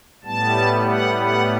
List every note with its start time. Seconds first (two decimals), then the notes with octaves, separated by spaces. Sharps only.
0.24 A2 G3 B3 A5
0.89 F#5
1.20 F#5